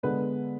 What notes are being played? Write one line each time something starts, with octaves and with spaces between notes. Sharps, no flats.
D3 G#3 B3 B4